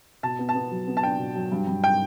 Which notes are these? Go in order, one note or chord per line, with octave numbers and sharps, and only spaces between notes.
B2 A5
B3
A5
B3
F#3
B3
A5
D4 G5
B2
F#3
G2
G2
G5